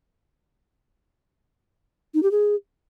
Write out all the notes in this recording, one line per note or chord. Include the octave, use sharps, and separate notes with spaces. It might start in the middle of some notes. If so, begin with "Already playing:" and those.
D#4
G4
G#4